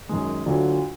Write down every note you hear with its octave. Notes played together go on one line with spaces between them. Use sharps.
F#2 D#3 G#3
D2 D3 F#3 D4 F4